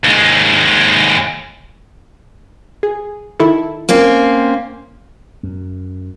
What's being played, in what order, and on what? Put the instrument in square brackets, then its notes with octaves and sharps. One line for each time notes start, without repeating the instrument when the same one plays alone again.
[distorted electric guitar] D#2 G#3
[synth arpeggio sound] G#4
D#3 E4 A4
[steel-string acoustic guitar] A#3 C4 C#4
[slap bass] F#2